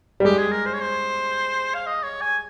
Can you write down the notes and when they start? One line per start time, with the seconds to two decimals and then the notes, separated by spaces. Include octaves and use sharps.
0.20 G3
0.25 G#3 G4
0.38 G#4
0.52 A#4
0.66 C5
0.74 C#5
0.81 C5
1.74 F5
1.86 D#5
2.03 C#5
2.21 G#5